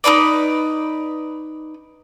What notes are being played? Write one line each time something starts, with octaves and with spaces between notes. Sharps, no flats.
D#4 F4 B4 D5